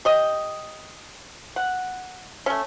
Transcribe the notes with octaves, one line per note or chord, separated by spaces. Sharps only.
G4 D#5
F#5
A3 C#4